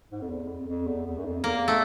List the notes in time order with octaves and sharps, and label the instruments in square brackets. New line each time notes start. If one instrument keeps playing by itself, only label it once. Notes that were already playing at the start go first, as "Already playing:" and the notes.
[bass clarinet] G#2
F2
E2
F2
F2
E2
E2
F#2
F2
[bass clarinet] E2 [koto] A#3
[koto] A3